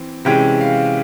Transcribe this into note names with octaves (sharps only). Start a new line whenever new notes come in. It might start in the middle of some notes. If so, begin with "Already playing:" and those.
Already playing: E3 C4
C3 E3 G#3 C#4 G5
F5